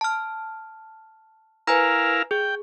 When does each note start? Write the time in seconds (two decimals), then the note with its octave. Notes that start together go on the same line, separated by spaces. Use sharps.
0.01 A5 F6
1.67 E4 A#4 B4 F5 G#5 A#5
2.31 G#4 G5